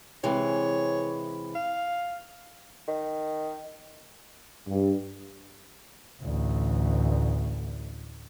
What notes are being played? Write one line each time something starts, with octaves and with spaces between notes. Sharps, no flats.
C3 E3 G#3 C#5
F5
D#3
G2
A1 D2